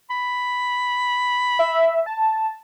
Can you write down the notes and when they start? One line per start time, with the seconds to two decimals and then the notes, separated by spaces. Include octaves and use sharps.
0.10 B5
1.59 E5
2.06 A5